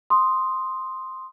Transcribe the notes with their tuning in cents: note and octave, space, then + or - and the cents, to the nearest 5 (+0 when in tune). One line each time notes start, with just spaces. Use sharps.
C6 +0 D#6 +0